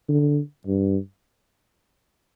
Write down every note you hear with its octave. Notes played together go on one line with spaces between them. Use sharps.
D3
G2